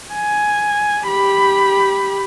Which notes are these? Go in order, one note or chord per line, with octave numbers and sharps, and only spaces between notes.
G#5
G4 B5